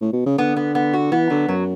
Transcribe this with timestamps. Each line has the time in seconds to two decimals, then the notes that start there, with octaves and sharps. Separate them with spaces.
0.01 A2
0.13 B2
0.26 C#3
0.38 D3 B3
0.56 B3
0.75 B3
0.93 F#4
1.12 E3 B3
1.30 D3 F#3
1.48 F#2 F#3